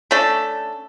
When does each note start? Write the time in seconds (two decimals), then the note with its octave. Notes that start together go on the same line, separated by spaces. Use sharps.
0.11 A3 C#4 D4 A4